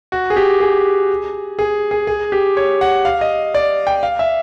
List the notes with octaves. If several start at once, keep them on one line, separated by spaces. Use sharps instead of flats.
F#4
G#4
G4
G#4
G#4
G#4
G#4
G4
C#5
F#5
F5
D#5
D5
G5
F5
E5